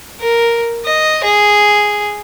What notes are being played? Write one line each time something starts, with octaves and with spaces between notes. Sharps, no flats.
A#4
D#5
G#4